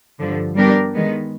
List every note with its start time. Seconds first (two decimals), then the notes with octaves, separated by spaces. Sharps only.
0.19 G2 D3 F3
0.56 G3 B3 D4 G4 A#4
0.94 D#3 G#3 B3